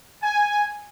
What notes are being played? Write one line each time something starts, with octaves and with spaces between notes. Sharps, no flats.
G#5